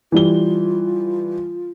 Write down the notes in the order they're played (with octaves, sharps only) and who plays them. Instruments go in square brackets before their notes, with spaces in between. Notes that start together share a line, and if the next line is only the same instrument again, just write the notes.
[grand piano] E3 G3 G7 [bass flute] F4